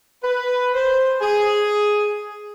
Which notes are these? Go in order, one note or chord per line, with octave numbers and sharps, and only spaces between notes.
B4
C5
G#4